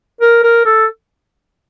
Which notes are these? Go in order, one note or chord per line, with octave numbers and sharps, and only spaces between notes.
A#4
A#4
A4